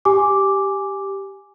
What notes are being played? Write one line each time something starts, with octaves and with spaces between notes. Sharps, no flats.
G4 G#5 D6